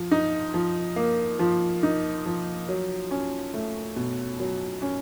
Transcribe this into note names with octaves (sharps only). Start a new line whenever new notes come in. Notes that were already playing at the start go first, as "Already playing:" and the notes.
Already playing: F3
D#4
F3
A#3
F3
D#4
F3
F#3
C#4
A3
B2
F#3
C#4